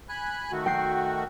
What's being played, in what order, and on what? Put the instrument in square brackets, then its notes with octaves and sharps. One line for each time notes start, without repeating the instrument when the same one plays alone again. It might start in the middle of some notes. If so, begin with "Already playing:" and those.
[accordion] G#5 B5 F#6
D#3 A3 F#4
[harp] G5 C7